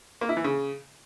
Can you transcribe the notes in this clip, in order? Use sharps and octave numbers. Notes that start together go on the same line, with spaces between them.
A#3
E4
E3
C#3